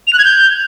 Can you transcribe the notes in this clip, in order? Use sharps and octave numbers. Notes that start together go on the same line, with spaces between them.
F7
F#6
G#6
G6